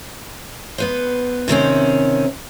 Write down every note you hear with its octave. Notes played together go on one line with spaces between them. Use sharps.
B3 B4 C5
C3 D#3 C4 C#4